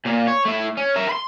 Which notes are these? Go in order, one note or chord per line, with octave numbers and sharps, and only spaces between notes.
A#2 A#3
C#5
A3 E4
C#4
A#4 E5
B5 C6